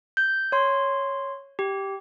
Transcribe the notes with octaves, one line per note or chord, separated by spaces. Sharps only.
G6
C#5 C6
G4